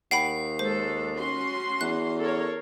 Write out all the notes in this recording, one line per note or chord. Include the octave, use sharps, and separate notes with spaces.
D#2 F#5 G5 B5 C7
G#3 A4 C5
C#4 F#4 C6
E2 F#6
A4 A#4 C#5